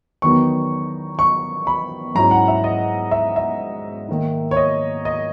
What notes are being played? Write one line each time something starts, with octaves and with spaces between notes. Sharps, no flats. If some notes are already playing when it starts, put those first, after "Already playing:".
E2 D#3 F#3 B3 D#4 C#6
C#6
B5
G#2 F#3 C#4 E4 A#5
F#5
E5
D#5
E5
E5
D#3 A#3 D#4
C#5
D#5
D#5